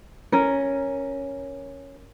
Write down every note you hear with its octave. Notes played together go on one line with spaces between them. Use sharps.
C#4 A#4